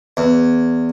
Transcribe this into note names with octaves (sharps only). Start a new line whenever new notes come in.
E2